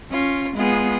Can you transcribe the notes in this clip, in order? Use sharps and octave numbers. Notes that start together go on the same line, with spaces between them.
C#4 F4
G#3 B3 F4 G#4